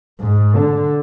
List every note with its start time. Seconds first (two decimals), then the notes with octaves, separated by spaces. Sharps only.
0.20 G#2
0.56 D3